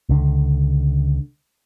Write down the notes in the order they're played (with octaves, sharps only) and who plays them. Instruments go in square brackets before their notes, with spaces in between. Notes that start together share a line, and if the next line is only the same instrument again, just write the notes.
[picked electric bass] C#2 D3